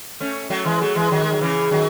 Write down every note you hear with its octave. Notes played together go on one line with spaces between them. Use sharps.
A3 C#4
F#3 A3
E3 G#3
F#3 A3
E3 G#3
D#3 F#3
G#3
F#3
C#3 E3
D#3 F#3